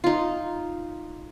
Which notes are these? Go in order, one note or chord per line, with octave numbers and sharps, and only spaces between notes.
D#4 F4